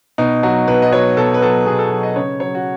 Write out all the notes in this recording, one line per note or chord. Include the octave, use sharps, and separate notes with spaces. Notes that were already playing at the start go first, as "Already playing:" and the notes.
B2 D#4
F#3 F#4
B2 B4
D#5
F#3 C#5
B2 A4
B4
F#3 A4
B2 G#4
A4
F#3
D#5
C#3 C#5
F#3 C#5
F#4